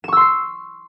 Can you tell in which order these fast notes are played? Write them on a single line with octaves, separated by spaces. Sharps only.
E7 C#6 E6 C6 C7